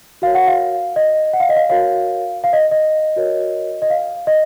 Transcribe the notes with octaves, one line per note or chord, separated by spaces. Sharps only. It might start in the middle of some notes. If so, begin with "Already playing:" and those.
F#4 A#4 C#5 F5
F#5
F5
D#5
F#5
F5
D#5
F5
F#4 A#4 C#5 F5
F5
D#5
D#5
F#4 A#4 C#5
D#5
F5
D#5